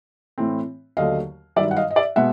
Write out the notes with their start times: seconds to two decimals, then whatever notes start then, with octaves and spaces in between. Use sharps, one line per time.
0.38 A2 E3 A3 C4
0.97 D#2 D3 F#3 A3 D#5 F5
1.56 G2 D#3 F#3 D5 E5
1.71 F#5
1.76 D#5 F5
1.90 D#5
1.96 D5 E5
2.16 B2 G#3 B3 E5 F#5